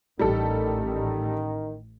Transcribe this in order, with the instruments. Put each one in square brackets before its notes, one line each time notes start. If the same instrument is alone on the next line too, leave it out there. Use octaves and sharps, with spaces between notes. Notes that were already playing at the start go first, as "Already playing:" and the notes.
[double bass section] A1 [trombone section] D#3 [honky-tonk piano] G3 G4 A4